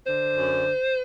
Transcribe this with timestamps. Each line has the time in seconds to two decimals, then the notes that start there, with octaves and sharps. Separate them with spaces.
0.06 D3 C5
0.36 F#2